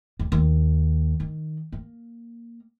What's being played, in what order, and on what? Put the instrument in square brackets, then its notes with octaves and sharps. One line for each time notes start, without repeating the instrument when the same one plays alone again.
[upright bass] D#2
D#2
D#3
A#3